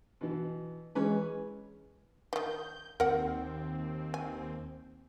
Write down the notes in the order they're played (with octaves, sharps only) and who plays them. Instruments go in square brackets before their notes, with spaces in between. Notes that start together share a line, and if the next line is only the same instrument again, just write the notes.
[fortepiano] B2 E3
[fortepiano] E3 C#4 B4 [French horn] G#3
[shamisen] D#3 E3 [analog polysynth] G6
[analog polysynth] D#2 C4 [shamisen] A#4 F#5
[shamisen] G#5